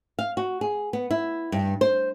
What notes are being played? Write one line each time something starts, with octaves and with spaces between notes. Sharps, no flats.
F5
F#4
G#4
B3
E4
G2
C5